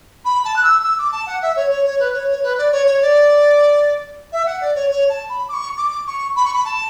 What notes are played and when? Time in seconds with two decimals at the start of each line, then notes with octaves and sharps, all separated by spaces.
0.25 B5
0.44 A5
0.56 F#6
0.63 E6
0.83 E6
0.98 D6
1.12 A5
1.26 F#5
1.41 E5
1.56 C#5
1.70 C#5
1.85 C#5
1.99 B4
2.13 C#5
2.28 C#5
2.43 B4
2.58 D5
2.72 C#5
2.86 C#5
3.01 D5
4.32 E5
4.46 F#5
4.61 D5
4.75 C#5
4.90 C#5
5.09 A5
5.29 B5
5.48 D6
5.53 C#6
5.77 D6
6.06 C#6
6.35 B5
6.44 C#6
6.53 B5
6.64 A5